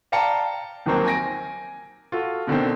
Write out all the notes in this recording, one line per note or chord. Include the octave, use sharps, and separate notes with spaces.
D5 F5 G5 A5 A#5 C#7
D#2 D#3 F3 F#3 A#3 C4
G#5 A#6 D7
F4 F#4 A4
B2 D3 D#3 C4